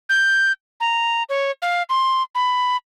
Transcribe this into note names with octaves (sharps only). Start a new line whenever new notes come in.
G6
A#5
C#5
F5
C6
B5